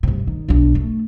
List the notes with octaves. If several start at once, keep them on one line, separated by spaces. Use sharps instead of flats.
G2 C3
D#3
B1 D4
A3